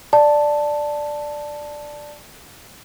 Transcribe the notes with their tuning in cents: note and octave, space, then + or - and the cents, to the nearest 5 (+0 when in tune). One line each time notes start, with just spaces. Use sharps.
D5 +5 A5 +0